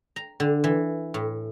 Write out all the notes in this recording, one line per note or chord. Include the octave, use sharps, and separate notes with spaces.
A#5
D3
E3
A2